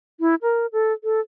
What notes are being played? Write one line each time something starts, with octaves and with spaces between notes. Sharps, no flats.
E4
A#4
A4
A4